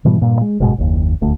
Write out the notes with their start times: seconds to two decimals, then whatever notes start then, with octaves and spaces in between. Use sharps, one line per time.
0.05 G#2 B2 E3 G3
0.21 G2 A#2
0.41 G#3
0.60 F#1 G#2 B2 G#3
0.78 F#1 D#2
1.21 D#1 D2 A3